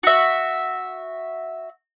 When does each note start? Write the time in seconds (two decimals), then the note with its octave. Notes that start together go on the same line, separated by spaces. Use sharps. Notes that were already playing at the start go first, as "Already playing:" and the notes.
0.03 F#4 E5